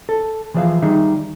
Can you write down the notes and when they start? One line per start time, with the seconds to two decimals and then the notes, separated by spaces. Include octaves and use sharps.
0.09 A4
0.54 E3 F3 G#4 D5 E5 F5
0.82 D#3 G3 D#4 G#4 E5